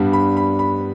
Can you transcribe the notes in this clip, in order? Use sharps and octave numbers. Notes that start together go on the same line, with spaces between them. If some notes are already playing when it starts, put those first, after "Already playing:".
Already playing: G2 G3 B3 D4
B5
B5
B5